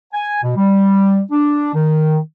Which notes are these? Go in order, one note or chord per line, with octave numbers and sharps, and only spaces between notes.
G#5
B2
G3
D4
D#3